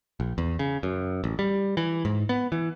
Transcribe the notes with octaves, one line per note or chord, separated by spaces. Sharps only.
A#1
E2
C#3
F#2
A1
G3
E3
G#2
B3
E3